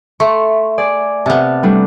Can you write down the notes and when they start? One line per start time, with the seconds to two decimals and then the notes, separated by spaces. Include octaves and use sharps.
0.20 A3 C6 C#6
0.78 G#4 D5
1.26 C3 B3 A5 F6
1.63 G3 A3 D4